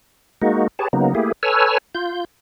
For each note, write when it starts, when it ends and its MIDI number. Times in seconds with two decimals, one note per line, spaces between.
0.42 0.68 56
0.42 0.68 58
0.42 0.68 63
0.42 0.68 66
0.79 0.88 67
0.79 0.88 68
0.79 0.88 71
0.79 0.88 73
0.79 0.88 81
0.93 1.14 49
0.93 1.14 54
0.93 1.14 58
0.93 1.14 59
0.93 1.14 63
1.15 1.32 57
1.15 1.32 58
1.15 1.32 64
1.15 1.32 67
1.15 1.32 68
1.43 1.78 69
1.43 1.78 71
1.43 1.78 73
1.43 1.78 80
1.43 1.78 88
1.43 1.78 89
1.95 2.25 65
1.95 2.25 91